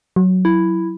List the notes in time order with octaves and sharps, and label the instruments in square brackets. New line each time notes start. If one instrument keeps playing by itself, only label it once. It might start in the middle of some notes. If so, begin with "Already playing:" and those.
[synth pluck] F#3
[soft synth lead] E4